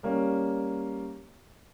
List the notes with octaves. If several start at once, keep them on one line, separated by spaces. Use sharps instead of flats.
G3 A#3 C#4